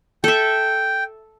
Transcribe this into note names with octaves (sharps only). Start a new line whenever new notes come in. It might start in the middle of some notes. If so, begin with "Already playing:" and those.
A4 E5 G5